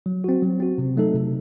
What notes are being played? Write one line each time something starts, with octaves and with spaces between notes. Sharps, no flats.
F#3
C4 F#4
F#3
C4 F#4
C3
F#3 A3 D#4 A4
C3